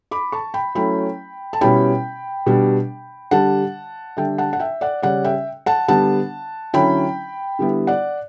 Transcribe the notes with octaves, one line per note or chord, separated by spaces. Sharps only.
B5 D6
A5 C#6
G5 B5
F#3 A3 C#4 E4 G5 B5
A5
B2 G3 C#4 E4 G5 B5
B2 G3 D4
D3 G3 D4 F#5 A5
D3 G3 D4 E5 G5
F#5 A5
F#5
E5 G5
D5 F#5
C#3 G3 C#4 D5 F#5
E5 G5
F#5 A5
D3 G3 B3 D4 F#5 A5
D3 F#3 C#4 E4 G5 B5
D3 G3 B3 E4
D5 F#5